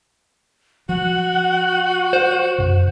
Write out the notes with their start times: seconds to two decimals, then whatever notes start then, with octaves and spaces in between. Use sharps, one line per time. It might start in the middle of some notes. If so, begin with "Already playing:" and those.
0.89 F3 F#4 F#5
2.13 C5
2.58 F#2 C3